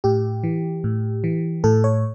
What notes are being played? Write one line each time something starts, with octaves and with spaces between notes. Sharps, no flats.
A2 G4
E3
A2
E3
A2 A4
C#5